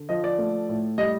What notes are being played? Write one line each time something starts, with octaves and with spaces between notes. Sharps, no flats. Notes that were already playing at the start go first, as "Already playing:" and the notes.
Already playing: D3
F3 D#5
D5
A3
A2
G3 D#5